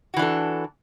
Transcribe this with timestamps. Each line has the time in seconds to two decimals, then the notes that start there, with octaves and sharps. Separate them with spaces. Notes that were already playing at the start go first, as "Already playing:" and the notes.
0.14 F#4
0.17 E3
0.19 D4
0.22 A4